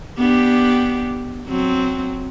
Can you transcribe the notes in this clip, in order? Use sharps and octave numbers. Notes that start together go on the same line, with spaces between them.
B3 D4 G4
F#3 C4